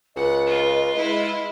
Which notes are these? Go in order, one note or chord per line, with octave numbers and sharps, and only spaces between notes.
C#2 D#5 F#5
F4 B4
G#3 E4